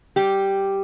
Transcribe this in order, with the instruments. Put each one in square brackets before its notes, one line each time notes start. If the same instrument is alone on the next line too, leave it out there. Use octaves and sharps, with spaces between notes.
[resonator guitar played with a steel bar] G3 G4